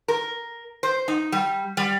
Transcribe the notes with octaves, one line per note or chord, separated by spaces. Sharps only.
A#4
C5
D#4
G3
G3